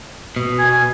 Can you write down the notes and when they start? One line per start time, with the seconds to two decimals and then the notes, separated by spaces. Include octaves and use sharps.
0.36 B2
0.59 G#5